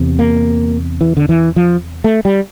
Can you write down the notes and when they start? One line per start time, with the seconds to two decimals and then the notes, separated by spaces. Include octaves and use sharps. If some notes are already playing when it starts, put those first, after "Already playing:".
Already playing: E2 C3
0.19 A#3
1.01 E3
1.17 D3
1.29 E3
1.56 F3
2.04 A3
2.25 G3